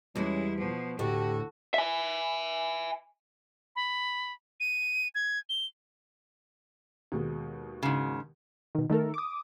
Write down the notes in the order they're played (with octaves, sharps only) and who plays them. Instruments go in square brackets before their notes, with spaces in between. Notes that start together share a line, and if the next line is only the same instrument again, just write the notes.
[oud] E2 F#4 [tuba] G3 [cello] G#3 E4 [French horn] C#4
[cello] B2 F3 [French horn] B3
[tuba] D2 [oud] A2 [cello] F#4 [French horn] G4
[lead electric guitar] E5 G#5
[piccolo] B5
D#7
G#6
G7
[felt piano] D#2 B2 G#3
[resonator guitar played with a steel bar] G#2 C#3
[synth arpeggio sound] B2 D#3
D#3 A3 A4 A#4
D6 D#6